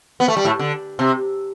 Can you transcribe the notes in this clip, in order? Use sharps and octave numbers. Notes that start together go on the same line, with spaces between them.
B3
A3
G3
A2 A3
D3
C3